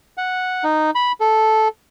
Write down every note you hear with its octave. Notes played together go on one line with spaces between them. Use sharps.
F#5
D#4
B5
A4